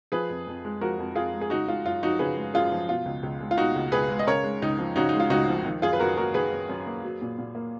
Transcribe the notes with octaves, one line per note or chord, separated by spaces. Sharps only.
F3 G#4 B4
F2
F2
G#3
F3 F#4 A#4
F2
F2 F4 G#4
G#3
G#4
C#3 D#4 F#4
G#3 F4
F#2 F4
F3 D#4 F#4
C#3 G#4 B4
G#3
F#2 F4 G#4
F3
B2 F4
C#2
C#2
G#3
F4
B2 D#4 F#4
C#2
C#2 G#4 B4
G#3
D#5
C#3 A#4 C#5
G#3
C#2 D#4
F3
C#3 D#4 F#4
G#3 D#4
F4
C#2 D#4 F#4
F3
D#3
F#2 F4 G#4
B4
F#2 F#4 A#4
A#3 F#4 A#4
D#3 G#4 B4
F#2
F#2
A#3
F#3
A#2
A#2
A#3